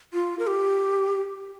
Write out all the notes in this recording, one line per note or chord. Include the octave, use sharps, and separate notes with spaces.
F4
A#4
G4